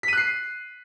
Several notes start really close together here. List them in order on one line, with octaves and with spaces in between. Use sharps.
B6 D#7 F#6 C7